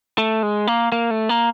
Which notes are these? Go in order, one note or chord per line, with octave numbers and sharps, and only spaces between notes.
A3
G#3
A#3
A#3
A3
A#3